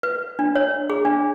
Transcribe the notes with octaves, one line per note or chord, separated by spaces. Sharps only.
B4
D4
C#5
G#4
D4